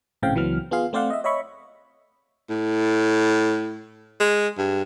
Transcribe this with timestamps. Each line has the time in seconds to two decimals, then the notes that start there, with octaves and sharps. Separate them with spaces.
0.23 A#1 A2 C#3 C4 F5 G5
0.35 C#2 E3 F#3 B3 F6
0.71 B3 F4 G#4 F5
0.93 A3 C4 C5 D5 F5 F#5
1.10 D#5 E5
1.24 C#5 D#5 E5 B5 C#6
2.50 A2
4.20 G#3
4.58 G2